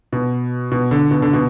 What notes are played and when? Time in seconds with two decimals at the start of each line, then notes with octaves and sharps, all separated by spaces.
0.13 B2
0.72 B2
0.91 D3
1.11 B2
1.22 D3
1.33 B2